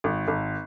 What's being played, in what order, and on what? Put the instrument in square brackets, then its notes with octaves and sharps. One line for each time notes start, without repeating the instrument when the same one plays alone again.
[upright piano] G#1
G#1